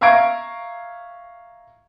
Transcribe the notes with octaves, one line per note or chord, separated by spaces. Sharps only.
E5 F5 A#5 C#6 G#6 D7